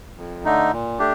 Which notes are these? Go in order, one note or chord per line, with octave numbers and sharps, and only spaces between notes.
F2
D3 A3 D#4
A#2
A3 D4 G4